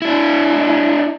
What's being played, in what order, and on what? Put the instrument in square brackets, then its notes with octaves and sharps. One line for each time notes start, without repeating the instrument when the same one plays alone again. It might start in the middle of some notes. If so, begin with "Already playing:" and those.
[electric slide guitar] D4 E4